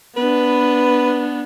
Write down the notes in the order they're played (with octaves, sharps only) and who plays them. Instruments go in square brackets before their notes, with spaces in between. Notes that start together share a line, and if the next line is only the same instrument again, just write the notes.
[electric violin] B3 D4 [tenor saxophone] B4